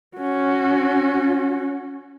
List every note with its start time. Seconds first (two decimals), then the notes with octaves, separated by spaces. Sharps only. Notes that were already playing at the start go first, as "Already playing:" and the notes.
0.17 C#4 F#4